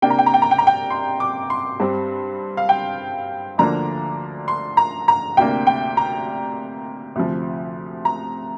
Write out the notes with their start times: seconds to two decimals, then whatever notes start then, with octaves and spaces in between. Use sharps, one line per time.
0.02 C3 A#3 D4 G5
0.10 A#5
0.18 G5
0.26 A#5
0.34 G5
0.42 A#5
0.51 G5
0.58 A#5
0.67 G5
0.90 C6
1.20 D6
1.50 C6
1.80 G2 G3 C4
2.57 F5
2.69 G5
3.58 D2 D3 F3 A#3 D4 A#5
4.48 C6
4.77 A#5
5.08 A#5
5.37 D2 C3 A#3 D4 G5
5.67 G5
5.97 A#5
7.16 D2 C3 F3
8.05 A#5